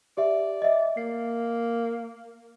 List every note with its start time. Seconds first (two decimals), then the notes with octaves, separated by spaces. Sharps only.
0.17 G4 D5 E5
0.62 D#5 E5
0.97 A#3 C7